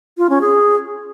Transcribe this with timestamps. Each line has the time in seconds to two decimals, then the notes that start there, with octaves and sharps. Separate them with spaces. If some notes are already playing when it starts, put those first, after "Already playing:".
0.18 F4
0.30 C#4
0.41 G#4